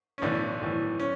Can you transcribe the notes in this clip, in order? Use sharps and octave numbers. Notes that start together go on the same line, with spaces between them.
C#4
B1 A2 E3 D4
B1 A2 E3
C#4